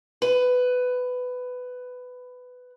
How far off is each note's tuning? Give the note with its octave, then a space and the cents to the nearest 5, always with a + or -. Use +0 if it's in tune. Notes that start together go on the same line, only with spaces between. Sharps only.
B4 +15